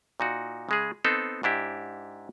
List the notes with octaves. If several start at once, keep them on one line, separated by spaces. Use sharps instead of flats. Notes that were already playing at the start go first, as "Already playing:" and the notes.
A#2 D#4 F#4
C#3 G#3 G#4
B3 C4 D#4 A4 C5
G#2 D4 E4 G4